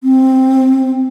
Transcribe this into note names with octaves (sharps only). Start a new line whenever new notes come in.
C4